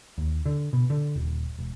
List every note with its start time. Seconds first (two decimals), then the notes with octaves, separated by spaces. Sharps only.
0.18 D#2
0.45 D3
0.73 B2
0.90 D3
1.16 D#1
1.58 E1